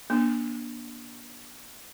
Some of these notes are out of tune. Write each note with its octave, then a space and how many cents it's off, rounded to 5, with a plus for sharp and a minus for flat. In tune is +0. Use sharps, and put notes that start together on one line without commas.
A#3 +40 D4 +0